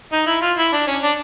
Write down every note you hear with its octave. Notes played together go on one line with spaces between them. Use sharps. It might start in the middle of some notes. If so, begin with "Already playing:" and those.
D#4
E4
F4
E4
D4
C#4
D4